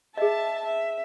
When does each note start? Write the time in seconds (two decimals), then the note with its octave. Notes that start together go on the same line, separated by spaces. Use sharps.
0.18 G#4 D#5 E5 A5
0.65 E5